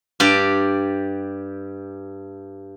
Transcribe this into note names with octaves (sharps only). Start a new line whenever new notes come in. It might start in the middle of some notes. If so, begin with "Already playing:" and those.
G2 G4 D5